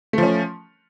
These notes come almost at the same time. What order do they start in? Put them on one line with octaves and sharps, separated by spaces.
A3 F3 C#4